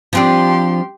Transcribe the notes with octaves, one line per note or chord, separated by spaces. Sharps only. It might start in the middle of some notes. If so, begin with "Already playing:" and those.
F3 C4 D4 G4 C6